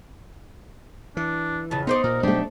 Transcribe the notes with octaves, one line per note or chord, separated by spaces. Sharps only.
E3 D4
F2 C#3 A5
B3 D#4 C5 D5 C6
A#2 A#4
B2 F#3 A3 D4 G4